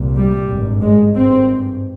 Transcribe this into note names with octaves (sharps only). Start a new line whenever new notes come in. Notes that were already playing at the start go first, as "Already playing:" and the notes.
Already playing: C2 A#2
G3
G#1 G2
G#3
G#1 G2 C4